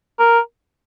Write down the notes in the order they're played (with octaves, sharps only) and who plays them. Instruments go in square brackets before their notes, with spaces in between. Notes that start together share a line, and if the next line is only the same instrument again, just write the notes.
[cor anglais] A#4